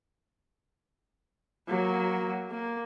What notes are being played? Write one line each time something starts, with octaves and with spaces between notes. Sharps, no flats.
F#3 A#3
A#3